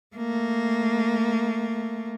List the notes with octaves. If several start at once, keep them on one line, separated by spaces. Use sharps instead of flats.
A3 A#3